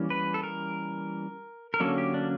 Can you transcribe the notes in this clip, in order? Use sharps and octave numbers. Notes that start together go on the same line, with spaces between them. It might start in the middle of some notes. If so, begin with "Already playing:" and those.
Already playing: E3 G3 A#3 C#4
B4
A4
A#4
A#4
D3 F#3 A#3 C#4 A4
G4
D4